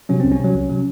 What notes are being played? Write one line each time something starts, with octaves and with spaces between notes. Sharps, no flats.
C3 F#3 C#4
C2 C4
C#4
C3 F#3
C2
C3 F#3